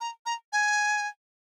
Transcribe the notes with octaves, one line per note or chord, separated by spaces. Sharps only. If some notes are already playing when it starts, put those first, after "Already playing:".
A#5
A#5
G#5